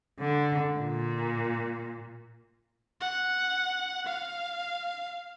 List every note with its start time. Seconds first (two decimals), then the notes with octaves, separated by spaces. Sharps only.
0.20 D3
0.79 A#2
3.00 F#5
4.06 F5